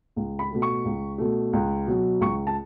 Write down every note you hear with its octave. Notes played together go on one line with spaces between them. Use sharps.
C#2
B5
B2 A3
C#6
C#2
B2 A3
C#2
B2 F#3
C#2 C#6
A5